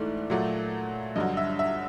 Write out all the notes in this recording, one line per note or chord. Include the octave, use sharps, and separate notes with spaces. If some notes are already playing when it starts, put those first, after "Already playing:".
Already playing: G#2 E3 A3 D5
A#2 F#3 A3
G2 D3 F#3 D#5
E5
E5